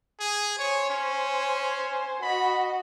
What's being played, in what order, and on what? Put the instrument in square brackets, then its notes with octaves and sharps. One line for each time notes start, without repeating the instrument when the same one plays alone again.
[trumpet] G#4
[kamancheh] C5 G#5 [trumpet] C#5
[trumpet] C#4
[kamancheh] F#4 D#5 [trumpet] B5